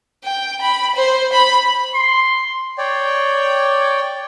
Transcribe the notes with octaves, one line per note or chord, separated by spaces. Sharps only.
G5
B5
C5
B5
C6
C#5 D5 G5